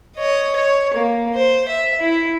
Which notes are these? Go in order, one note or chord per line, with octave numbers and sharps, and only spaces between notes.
C#5 D#5
C#5
A#3
C5
E5
E4